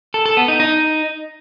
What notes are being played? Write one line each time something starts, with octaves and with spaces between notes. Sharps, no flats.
A4
A4
B3
D#4
D#4